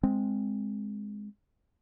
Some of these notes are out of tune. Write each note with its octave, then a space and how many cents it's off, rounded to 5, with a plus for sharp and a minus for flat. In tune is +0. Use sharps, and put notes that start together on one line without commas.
G#3 +0 C4 +0